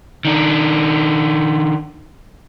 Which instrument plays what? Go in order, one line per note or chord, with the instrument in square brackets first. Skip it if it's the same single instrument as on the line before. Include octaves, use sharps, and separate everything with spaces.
[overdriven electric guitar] D#3 D4